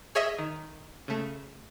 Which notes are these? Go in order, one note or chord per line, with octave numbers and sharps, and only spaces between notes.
G#4 C#5 D#5 E5
D#3
C#3 A3